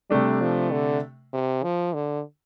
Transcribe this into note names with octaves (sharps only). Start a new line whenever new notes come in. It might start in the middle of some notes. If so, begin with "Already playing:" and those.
C3 G3 A3 D4
F3
D3
C3
F3
D3